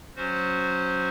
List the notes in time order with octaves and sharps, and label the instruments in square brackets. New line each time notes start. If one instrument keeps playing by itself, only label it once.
[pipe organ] F#3 C#4 F#4 C5